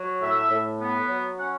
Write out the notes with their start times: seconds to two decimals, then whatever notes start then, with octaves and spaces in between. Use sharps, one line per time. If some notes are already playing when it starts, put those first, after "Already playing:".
Already playing: F#3
0.21 A2 E5
0.50 A2
0.80 B3
1.08 F#3
1.38 C#4 F#5